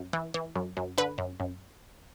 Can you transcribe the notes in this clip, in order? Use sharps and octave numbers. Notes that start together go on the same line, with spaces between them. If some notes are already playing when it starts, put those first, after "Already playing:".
Already playing: F#2
E3
E3
F#2
F#2
D3 B4
F#2
F#2